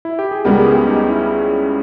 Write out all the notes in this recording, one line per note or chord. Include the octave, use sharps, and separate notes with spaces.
E4
G4
G#4
C#2 C#3 G3 B3 G4 A#4
G4
E4 G#4
D#4 G4
C#4 E4